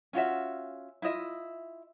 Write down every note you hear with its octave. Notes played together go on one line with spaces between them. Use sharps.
C#4 F4 F#4 E5
E4 F4 D#5 E5